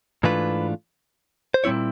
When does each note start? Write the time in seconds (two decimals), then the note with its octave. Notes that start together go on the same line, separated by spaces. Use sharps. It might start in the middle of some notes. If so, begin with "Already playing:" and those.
0.23 G#2 E3 A3 D4 F4 B4
1.54 C5
1.64 A#2 G3 C4 E4 C#5